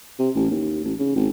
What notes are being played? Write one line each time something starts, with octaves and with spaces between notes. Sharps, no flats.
C3
A1
D#2
A1
C#3
G#1